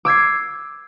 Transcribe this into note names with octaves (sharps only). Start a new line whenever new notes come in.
D6 E6 G#6 C7